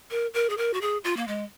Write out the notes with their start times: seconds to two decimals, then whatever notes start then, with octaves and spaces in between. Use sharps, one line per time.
0.11 A#4
0.34 A#4
0.50 G#4
0.57 A#4
0.74 F#4
0.81 G#4
1.04 F4
1.17 A#3
1.28 G#3